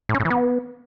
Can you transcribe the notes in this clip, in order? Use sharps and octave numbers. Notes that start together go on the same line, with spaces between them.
A2
C#4
A2
E3
B3